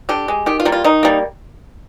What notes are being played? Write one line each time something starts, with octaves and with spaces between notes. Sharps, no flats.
D3 G4
G#3
D#3 G4
F4
G3 A#3
F4
D#3 D#4
G3 A#3